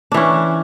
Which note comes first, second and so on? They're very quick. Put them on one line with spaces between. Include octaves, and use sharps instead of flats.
D4 E3 C#4